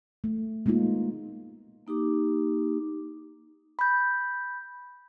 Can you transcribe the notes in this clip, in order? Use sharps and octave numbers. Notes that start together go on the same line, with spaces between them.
A3
G#3 A#3 B3 D#4 F4
A#3 D#4 G4 D6
B5 G6